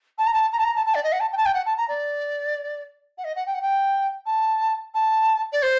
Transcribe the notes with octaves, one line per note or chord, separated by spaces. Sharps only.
A5
A#5
A5
A#5
A5
A#5
A5
A5
D5
D#5
F#5
A5
G5
A5
G5
F#5
A5
A#5
D5
F#5
D#5
F#5
G5
F#5
G5
A5
A5
D5
C5